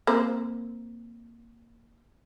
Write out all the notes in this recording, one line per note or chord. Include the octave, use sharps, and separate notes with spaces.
A#3 C4 C5